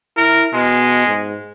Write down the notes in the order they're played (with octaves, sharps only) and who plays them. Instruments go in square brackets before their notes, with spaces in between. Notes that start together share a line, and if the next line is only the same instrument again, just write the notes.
[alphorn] E4 [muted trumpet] A#4
[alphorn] B2 [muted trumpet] G#3
[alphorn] G#2